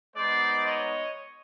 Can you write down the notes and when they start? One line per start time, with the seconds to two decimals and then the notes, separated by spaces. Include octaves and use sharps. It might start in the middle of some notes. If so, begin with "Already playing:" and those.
0.16 G#3 B3 D#4 C5 D5
0.65 C#5 D#5